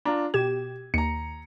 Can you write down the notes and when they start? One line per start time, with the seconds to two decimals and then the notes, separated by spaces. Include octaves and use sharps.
0.05 D4 F4 A#5
0.34 B2 G4 G#6 E7
0.94 D#2 A#5 C#7